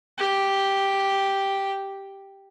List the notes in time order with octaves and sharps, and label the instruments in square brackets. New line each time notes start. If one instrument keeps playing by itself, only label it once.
[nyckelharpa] G4 G5